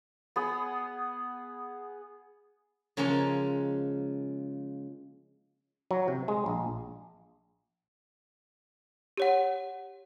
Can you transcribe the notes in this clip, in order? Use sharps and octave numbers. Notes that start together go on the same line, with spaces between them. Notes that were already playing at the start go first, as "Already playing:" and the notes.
B3 G#4 D#6
C#3 F3 G#3 A#3 C#4
F#3
C3
G#3
A#1
G4 C#5 F#5